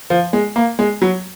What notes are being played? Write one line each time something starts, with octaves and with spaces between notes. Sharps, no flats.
F3
G#3
A#3
G#3
F#3